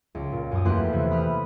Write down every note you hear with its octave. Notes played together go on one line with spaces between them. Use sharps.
C#2
A#2
F#2 D#6
E2 A3 A#3 G4 C6 F#6
C3 E3
B5 D#6 F6 F#6